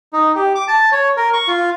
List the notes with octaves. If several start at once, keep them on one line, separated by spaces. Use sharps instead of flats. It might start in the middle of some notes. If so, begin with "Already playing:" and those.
D#4
G4
D6
A5
C#5
A#4
C#6
F4